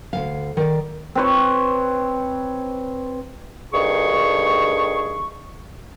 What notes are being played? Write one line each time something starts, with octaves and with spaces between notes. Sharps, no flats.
D2 D#3 F5
D#3 D5
C4 B4 C#5
D2 G2 D#3 G#4 C#6